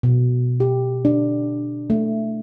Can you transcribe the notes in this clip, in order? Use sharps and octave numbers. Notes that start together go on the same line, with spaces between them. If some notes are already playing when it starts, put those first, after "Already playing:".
B2
G4
D4
A3